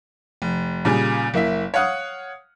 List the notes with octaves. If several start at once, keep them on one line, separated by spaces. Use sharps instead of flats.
F1
A#2 C#3 G3 G#4 G#5
F#1 A#3 E4 E5
C#5 F5 F#5 D#6